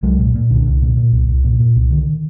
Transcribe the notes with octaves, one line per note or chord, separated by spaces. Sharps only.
C2 F#3 G#3
A#2
A#2
C2 D3
C2
A#2
A#2
C2
C2
A#2
A#2
C2
D3 D#3